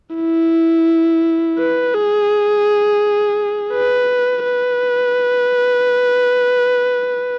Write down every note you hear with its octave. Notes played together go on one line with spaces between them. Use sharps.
E4
B4
G#4
B4
B4